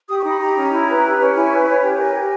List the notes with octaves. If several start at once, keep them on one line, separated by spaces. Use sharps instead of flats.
G4 D#6
C#6
D#4
B5
G4 A#5
C#4
E4
B4
G4
C#4
E4 G#5
B4
C#5
G4
A#4 G#5
G4